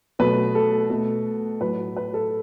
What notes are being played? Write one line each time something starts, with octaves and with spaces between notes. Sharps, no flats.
B2 F#3 A3 B4
A4
B2 A3
A2 F#3 A3 B4
B4
A4